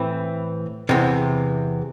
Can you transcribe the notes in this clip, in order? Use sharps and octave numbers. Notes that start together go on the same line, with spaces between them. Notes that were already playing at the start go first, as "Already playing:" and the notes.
Already playing: A2 E3 C4
E2 C3 E3